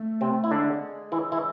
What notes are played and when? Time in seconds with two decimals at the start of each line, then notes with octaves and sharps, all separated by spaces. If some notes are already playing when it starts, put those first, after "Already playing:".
Already playing: A3
0.21 C3 C4
0.44 E4
0.51 D3 A3 D4
0.56 G#3
1.12 E3 E4
1.32 E3 E4